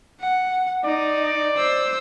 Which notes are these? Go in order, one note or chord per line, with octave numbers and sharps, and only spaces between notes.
F#5
D#4 D5
C5 E6